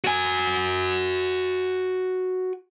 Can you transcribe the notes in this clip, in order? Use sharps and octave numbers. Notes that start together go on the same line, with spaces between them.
F#4 G#5